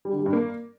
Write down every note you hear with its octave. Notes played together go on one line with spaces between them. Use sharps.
G3
D3
G3
G2
A#3